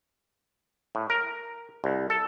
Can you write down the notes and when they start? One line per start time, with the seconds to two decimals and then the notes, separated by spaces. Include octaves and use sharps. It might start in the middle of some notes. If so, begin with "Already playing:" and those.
0.95 A2
1.10 A#4
1.84 C2
2.10 A4